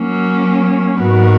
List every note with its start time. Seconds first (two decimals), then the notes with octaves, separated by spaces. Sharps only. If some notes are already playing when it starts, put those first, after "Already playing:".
Already playing: F#3 A#3 C#4
0.99 G#2 F#3 B3 F#4 A#4